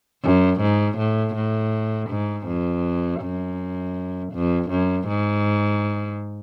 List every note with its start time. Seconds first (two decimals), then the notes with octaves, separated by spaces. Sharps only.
0.24 F#2
0.61 G#2
0.98 A2
1.35 A2
2.10 G#2
2.47 F2
3.21 F#2
4.34 F2
4.70 F#2
5.08 G#2